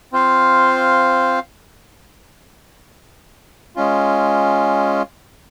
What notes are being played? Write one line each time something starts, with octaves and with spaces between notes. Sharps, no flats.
C4 F4 C5 F5
G#3 C#4 F4